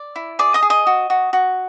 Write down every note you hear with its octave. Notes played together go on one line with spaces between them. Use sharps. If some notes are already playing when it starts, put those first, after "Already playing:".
Already playing: D5
E4
G#4 D5 D6
D#5 D#6
G#4
D#5 D#6
F#4
F#4
F#4